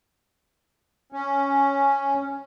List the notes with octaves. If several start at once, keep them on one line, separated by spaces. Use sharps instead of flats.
C#4